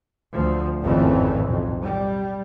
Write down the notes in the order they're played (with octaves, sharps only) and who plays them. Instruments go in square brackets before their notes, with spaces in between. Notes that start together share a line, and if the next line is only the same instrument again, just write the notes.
[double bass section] D2 F3
G#1 F2 A2 C#3 E3 A3
B1 F2
G3